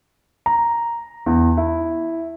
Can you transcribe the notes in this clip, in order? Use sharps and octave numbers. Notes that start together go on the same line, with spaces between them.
A#5
E2
E4